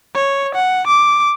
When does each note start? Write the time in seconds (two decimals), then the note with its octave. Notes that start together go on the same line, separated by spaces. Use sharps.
0.15 C#5
0.55 F#5
0.87 D6